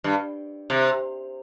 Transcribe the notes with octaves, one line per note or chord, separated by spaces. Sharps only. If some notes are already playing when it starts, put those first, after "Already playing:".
G2
C3